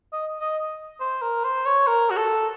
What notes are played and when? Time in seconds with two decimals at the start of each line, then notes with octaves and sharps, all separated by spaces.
0.13 D#5
0.40 D#5
1.00 C5
1.22 A#4
1.44 C5
1.66 C#5
1.87 A#4
2.10 F#4
2.17 A4